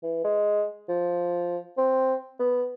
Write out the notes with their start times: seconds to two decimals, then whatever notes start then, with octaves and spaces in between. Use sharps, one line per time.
0.03 E3
0.24 G#3
0.89 F3
1.78 C4
2.39 B3